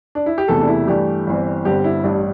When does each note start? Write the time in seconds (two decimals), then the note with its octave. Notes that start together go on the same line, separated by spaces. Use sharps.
0.15 D4
0.26 E4
0.38 G4
0.48 E1 E2 C3 E3 A3 A4
0.61 D4
0.68 E4
0.87 G2 E3 A3 D4 G4
1.27 G1 G2 E3 C4
1.65 G1 G2 D3 C4 G4
1.84 E4
2.04 A1 G2 G3 D4